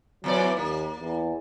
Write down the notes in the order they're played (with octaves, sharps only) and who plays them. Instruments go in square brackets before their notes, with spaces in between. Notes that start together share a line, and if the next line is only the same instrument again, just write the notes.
[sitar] E2 E3 D5 [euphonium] F#3
[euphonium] D#2 [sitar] A#3
[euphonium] E2